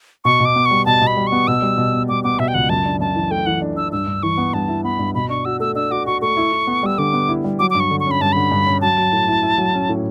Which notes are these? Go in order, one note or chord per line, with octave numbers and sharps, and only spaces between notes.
B2 C#6
B2
D6
B3
C#6
G3
B2 A5
B2
B5
G3
C#6
B3
B2 E6
G3
B2
B3
G3 D6
B3 D6
B2 E5
G5
C#2 F#5
F#2 A5
D4
F#2 A5
E3
A3 G5
E3 F#5
D4
D4 E6
G2 E6
G2
E3 C#6
B3
G2 A5
E4
B3 B5
G2
B2 B5
D4 C#6
F#4 E6
A3 E6
D4 E6
F#4 D6
F#4 C#6
A3 C#6
E4
E4
B3
G3 E6
D3 D6
B3
E4
G3
F#3 D6
G2 D6
C#6
D3
C#6
C#4 B5
G2 A5
D3 B5
G2
C#4
F#3 A5
F#3
A2
E4
E4
F#3
C#4
A2